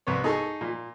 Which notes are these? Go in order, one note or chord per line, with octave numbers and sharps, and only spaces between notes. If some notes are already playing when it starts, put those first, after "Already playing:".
C2 B4 C#5
D#4 G#4 A4 C#6
A#2